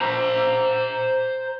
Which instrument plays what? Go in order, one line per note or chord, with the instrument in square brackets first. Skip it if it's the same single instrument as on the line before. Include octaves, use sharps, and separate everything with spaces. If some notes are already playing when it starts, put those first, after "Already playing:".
[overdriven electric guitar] C5 A#5